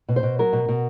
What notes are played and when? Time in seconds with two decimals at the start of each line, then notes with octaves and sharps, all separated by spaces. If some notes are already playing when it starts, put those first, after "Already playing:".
0.09 B2
0.16 C5
0.23 B2
0.39 F#3 A#4
0.53 B2
0.69 B2